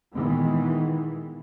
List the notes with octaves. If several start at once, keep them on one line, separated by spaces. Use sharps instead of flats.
A#2 D#3 E3 G#3 B3